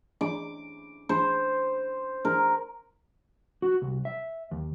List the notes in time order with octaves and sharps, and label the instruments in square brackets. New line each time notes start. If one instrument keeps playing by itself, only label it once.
[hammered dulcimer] D6
C5
A#4
[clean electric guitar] F#4
C2
E5
D#2